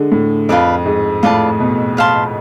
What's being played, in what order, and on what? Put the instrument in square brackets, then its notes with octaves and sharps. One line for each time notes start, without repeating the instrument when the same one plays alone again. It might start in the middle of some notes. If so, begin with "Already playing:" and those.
Already playing: [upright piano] D3 G#3
A2
[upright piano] F2 [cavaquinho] F4 B4 D5 A5
[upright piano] G#2
[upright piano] A2 [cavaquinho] F4 B4 D5 A5
[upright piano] B2
[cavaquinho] B4 F5 A5 C6